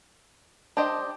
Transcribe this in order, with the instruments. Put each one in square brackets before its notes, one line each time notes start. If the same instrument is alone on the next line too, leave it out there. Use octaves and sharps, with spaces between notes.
[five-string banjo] D4 G4 C5 D#5